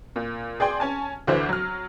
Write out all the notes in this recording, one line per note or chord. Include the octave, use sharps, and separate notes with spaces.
A#2
G#4 D5 G5 C6
C#4 G#5 A5
D2 D3 E3 C5 D6
F#3 F6